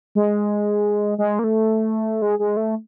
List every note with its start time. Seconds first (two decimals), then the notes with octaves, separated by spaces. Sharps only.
0.15 G#3
1.18 G#3
1.39 A#3
1.44 A3
2.22 G#3
2.39 G#3
2.57 A3